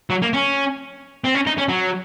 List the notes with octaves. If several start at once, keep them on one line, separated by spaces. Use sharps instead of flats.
F#3
A#3
C#4
C4
C#4
D#4
C#4
F#3